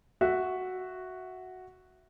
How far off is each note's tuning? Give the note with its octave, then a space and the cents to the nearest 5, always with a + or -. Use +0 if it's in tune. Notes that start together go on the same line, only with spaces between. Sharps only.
F#4 +0 E5 +0